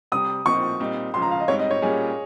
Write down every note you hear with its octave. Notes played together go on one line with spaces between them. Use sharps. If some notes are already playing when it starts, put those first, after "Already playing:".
C3 G3 C4 D#6
A#2 F3 C4 D#4 C#6
A#2 G3 C4 D#4
C#2 C#3 F3 C6
A#5
F5
D#5
G#2 G3 C4 D#4 C#5
D#5
C#5
A#2 G3 C#4 G#4